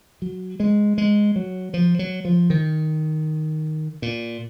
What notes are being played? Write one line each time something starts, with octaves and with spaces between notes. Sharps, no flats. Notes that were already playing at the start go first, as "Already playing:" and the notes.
F#3
G#3
G#3
F#3
F3
F#3
F3
D#3
A#2